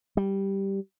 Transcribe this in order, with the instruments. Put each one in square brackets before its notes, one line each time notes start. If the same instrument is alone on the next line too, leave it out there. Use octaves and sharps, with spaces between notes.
[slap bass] G3